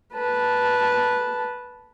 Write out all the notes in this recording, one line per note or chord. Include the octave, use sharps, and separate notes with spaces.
B4 A5